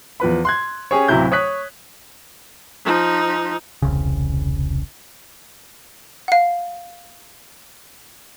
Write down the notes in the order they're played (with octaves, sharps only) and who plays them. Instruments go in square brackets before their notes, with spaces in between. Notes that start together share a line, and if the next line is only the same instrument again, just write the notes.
[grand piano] E2 F3 B4 B5
C6 F#6 G#6
C#4 G4 G#4 C#5
D1 C3 F#3 E4 G6
C#5 D#6 F#6 B6
[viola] F3 D#4
[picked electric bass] E1 C2 C#3
[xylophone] F5 F#5